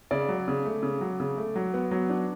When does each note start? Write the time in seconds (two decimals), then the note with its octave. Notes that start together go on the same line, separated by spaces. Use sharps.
0.11 C#3 D5
0.29 F#3
0.48 C#3
0.65 A3
0.83 C#3
1.01 F#3
1.20 C#3
1.37 A3
1.56 F#3
1.74 B3
1.91 F#3
2.09 D4